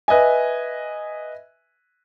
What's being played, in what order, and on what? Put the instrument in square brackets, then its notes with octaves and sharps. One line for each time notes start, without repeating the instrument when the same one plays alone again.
[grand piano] B4 D#5 E5 G#5